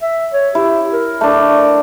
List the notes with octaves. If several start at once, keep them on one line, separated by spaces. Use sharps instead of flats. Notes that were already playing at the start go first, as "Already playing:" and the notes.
E5
C#5
E4 G4
A#4
A3 D4